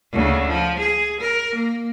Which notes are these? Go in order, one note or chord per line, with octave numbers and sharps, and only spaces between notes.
D2 C#3
F3
G#4
A#4
A#3